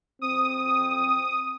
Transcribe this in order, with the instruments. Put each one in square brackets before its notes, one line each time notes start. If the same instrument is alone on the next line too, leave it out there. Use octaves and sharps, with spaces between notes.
[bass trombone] C4 [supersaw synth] D#6